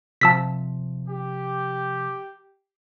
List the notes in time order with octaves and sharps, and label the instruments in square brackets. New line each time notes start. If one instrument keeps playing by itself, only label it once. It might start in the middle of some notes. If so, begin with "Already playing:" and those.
[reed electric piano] C3 F3 [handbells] A5 E6 B6
[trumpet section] G4